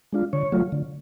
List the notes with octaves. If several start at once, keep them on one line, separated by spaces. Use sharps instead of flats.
G#3 D4 F4
D3 C#5
F#3 A3 F4
D3